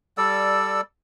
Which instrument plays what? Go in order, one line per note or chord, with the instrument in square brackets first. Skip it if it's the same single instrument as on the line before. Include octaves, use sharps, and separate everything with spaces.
[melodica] G3 A4 D5 E6